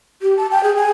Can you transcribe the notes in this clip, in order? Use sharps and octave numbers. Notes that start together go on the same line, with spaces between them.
G4
A5
G5
G#4
G#5